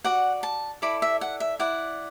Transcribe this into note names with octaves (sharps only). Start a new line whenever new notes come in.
F#4 D5 F#5
A5
E4 A4 D5 B5
E5
F#5
E5
E4 D5 F#5